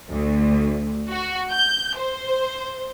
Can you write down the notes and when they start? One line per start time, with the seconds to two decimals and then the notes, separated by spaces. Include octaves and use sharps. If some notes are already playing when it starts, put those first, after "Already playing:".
0.10 D2
1.10 F#4
1.51 G6
1.97 C5